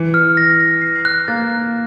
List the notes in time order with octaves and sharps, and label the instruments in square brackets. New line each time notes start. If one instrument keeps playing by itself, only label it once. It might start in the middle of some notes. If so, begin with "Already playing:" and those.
Already playing: [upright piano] E3 [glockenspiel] C#7
[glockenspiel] F6
A#6
F6
C7
F#6
[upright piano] A#3 [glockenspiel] A6
[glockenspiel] F#6